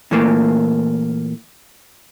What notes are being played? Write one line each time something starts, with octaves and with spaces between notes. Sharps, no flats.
A#2 E3 A3 A#3